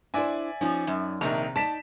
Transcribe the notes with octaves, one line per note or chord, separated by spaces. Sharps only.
D4 E4 C5 D5 E5 G#5
F3 C#4 D#4
F#2
A#1 C3 D#3 A#5
D#4 D5 A5 B6 E7